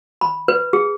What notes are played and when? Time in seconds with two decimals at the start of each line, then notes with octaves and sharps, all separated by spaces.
0.21 B5
0.48 B4
0.73 G#4